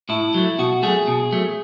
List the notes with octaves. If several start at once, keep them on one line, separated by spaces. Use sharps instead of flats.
A2 E4
F#3 A3
B2 F#4
F#3 A3 G#4
B2
F#3 A3